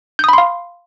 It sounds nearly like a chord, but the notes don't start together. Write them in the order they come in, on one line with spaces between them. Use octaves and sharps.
G6 D#6 B5 C6 F5